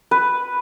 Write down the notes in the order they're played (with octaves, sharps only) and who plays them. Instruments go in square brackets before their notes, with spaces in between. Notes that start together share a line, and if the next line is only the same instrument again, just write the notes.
[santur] B4